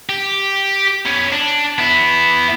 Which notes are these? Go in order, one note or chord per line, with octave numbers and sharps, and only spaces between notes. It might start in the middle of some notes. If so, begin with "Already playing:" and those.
G4
B3 C#4
D4
B3 E4